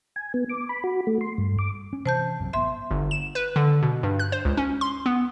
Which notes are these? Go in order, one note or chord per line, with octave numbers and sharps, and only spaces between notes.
G#5
B3
D6
B5
F#4
A3
C6
G2
D6
C#4
C3 E3 C5 A5 G6
A#1 F#2 C3
G#1 B3 E5 C6
G1
E7
B4
D3
B2
G2
F#6
C5
C#2
C#4
C6
B3